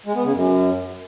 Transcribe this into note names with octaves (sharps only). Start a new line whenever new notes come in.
G#3
B3
C#3
F#2